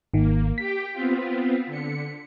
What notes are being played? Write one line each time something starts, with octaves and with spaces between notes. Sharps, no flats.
G#1 D#3 A#3
G4 G5 B6
B3 C4 F4
D3 C#7